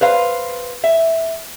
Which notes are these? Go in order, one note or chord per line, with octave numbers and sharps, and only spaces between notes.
B4 C5 F5
E5